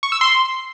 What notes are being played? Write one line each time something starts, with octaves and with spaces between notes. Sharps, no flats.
C#6
E6
C6